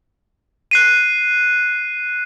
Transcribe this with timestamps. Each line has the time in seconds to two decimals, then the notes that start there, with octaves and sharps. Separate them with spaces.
0.71 F#6 C7 D#7